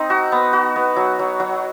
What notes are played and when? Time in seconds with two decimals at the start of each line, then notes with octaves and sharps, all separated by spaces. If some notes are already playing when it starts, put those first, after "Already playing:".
Already playing: C4 D#4
0.10 F#4
0.32 B3
0.53 F#4
0.76 B3
0.96 F#3
1.19 F#3
1.40 F#3